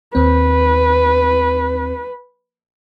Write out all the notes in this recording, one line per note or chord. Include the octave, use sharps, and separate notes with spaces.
D#2 C4 B4